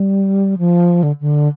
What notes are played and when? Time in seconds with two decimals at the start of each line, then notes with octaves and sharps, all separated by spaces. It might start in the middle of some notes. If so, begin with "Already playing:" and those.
Already playing: G3
0.58 F3
1.03 D3
1.21 D3